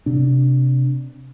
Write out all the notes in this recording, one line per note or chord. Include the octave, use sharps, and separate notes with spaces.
C3 D4